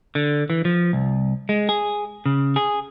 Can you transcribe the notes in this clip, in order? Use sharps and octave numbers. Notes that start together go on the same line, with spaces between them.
D3
E3
F3
C2
G#3
G#4
C#3
G#4